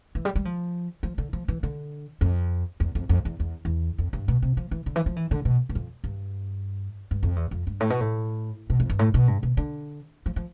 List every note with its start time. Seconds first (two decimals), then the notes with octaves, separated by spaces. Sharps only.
0.15 E3
0.25 G3
0.35 G3
0.45 F3
1.03 F3
1.18 D3
1.33 F3
1.48 E3
1.63 D3
2.21 F2
2.80 E2
2.95 F2
3.09 F2
3.25 E2
3.40 E2
3.65 E2
3.98 F2
4.13 G2
4.28 B2
4.42 C3
4.57 F3
4.71 E3
4.86 D3
4.96 E3
5.06 F3
5.16 E3
5.31 D3
5.45 B2
5.69 G2
5.75 F2
6.04 G2
7.11 G2
7.23 F2
7.36 E2
7.51 F2
7.67 G2
7.80 A2
7.90 B2
8.00 A2
8.70 B2
8.80 F2
8.90 G2
8.99 A2
9.14 B2
9.28 G2
9.43 B2
9.57 D3
10.26 F3
10.36 F3